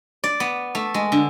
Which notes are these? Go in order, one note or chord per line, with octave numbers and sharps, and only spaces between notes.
D5
B3
A3
G#3
D3